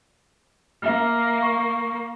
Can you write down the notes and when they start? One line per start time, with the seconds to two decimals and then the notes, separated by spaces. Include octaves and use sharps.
0.82 A#3 E5 F6
1.42 C#6